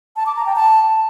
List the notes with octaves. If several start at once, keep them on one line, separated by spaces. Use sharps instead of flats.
A5
D6
A#5
G5
A5